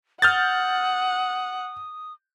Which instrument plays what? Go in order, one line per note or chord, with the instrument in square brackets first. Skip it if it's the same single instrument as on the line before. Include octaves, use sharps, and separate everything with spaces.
[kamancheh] F#5 [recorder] D#6 [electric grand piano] F6 G6 A6